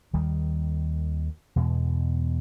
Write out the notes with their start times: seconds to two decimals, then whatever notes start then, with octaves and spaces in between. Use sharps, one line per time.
0.13 D#2 D#3 G3
1.56 E2 B2 G#3